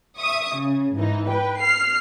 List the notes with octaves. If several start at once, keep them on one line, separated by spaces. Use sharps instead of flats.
E5 C#6 D#6
C#3
G#2 E3 D#4
B4 G5
F6 C7